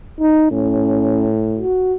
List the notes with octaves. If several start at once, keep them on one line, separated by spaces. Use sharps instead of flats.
D#4
A2 C#4
F#4